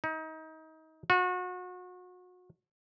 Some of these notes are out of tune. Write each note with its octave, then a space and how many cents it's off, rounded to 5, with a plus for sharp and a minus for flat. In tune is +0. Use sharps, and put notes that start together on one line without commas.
D#4 +30
F#4 -35